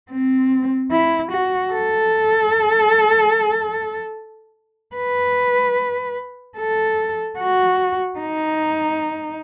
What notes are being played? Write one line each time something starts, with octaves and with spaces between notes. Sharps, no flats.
C4
E4
F#4
A4
B4
A4
F#4
D#4